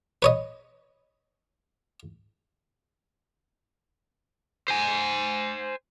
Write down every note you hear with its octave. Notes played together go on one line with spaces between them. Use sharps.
B4 C#5 D#5
C5 G#5